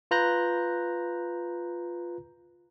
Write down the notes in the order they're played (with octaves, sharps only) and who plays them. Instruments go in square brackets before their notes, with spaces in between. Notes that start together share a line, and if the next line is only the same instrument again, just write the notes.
[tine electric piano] F4 B4 A#5 F#6 G6 A#6